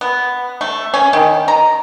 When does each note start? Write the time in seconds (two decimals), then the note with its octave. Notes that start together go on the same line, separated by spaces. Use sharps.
0.01 B3
0.61 A3
0.94 C#4
1.13 D#3
1.48 A#5